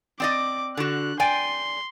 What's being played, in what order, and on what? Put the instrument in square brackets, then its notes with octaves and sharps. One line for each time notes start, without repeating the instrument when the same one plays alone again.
[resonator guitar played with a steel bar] C4 D5 D#5 [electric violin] D6
[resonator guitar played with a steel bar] D3 F#4 [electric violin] F#6
[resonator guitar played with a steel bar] D5 G5 G#5 [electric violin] C6